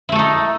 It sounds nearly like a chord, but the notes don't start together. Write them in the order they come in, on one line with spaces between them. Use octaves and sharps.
E4 A3 A4 D#4